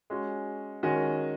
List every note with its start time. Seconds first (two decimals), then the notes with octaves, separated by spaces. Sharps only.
0.10 G#3 C#4 F#4
0.83 D#3 G#3 C#4 F#4 D#5